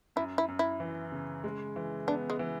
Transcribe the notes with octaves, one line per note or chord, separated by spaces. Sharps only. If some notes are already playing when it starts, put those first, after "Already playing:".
F#2 E4
E4
F#2
E4
E3
C#3
G#3
E3
B3 D4
G#3
E3